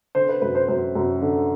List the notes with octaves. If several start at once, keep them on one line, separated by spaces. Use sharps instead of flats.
D3 C5
B4
F#2 B4
C5
F#2 C5
F#2
D3